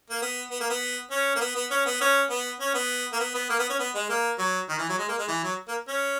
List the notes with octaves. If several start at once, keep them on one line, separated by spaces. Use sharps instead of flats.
A#3
B3
B3
A#3
B3
C#4
A#3
B3
B3
C#4
B3
C#4
B3
C#4
B3
A#3
B3
B3
A#3
B3
C#4
B3
G#3
A#3
F#3
D#3
E3
F#3
G#3
A#3
G#3
E3
F#3
A#3
C#4